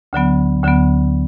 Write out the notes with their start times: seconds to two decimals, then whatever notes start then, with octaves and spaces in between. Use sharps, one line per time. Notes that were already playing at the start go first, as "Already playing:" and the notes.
0.13 D2 D3 F#3 B3
0.64 D2 D3 F#3 B3